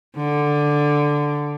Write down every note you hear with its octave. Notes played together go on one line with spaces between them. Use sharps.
D3